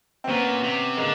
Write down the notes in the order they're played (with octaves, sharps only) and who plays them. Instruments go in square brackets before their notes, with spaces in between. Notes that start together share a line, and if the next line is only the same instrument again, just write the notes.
[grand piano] C4
[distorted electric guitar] A#2 [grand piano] B3 C#4
[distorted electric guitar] C3
[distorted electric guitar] D3 [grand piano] G#3 A#3